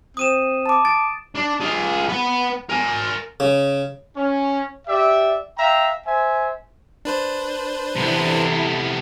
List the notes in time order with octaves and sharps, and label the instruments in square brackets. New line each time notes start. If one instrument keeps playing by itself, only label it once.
[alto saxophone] C4 [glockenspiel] D#6 D#7 E7
[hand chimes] A5 D6
[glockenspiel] A6 [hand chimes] D7
[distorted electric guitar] D4
F4 G#4
B3 B4
A#4 G#5
[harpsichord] C#3
[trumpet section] C#4
G4 D5 E5
E5 F5 G5 A#5
C5 E5 G#5
[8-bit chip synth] D4 B4 C5
[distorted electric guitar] C3 B3 [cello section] E3 E4 A4